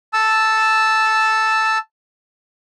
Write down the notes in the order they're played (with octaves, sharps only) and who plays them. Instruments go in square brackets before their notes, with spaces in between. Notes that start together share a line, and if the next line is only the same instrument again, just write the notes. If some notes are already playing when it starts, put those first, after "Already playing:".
[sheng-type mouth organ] A5 E6